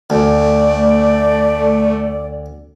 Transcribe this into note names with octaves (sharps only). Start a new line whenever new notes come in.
D2 A3 D5